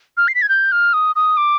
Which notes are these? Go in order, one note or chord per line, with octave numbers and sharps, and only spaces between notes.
F6
C7
B6
G#6
G6
F6
D#6
D#6
D6